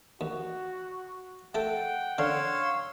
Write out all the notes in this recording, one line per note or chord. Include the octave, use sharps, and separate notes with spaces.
D#2 F#4
A3 A4 F#5 G5
D3 C#4 C#5 F5 C6 E6